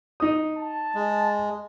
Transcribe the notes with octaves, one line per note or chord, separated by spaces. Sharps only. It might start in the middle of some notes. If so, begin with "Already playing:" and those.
D#4 D#6
A5
G#3